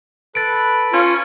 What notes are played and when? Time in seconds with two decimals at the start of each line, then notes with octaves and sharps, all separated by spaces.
0.35 A4 B4 B5 A6 D7
0.93 C#4 F4